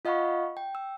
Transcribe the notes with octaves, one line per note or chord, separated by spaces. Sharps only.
F4 D#5 F5 F#5 B5 C#6
G5
E6